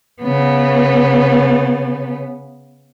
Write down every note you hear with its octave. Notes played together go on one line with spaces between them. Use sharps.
C#3 B3